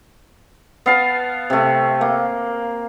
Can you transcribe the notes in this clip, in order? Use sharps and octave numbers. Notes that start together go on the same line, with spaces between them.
B3 F5 A5
C3 A3
A#3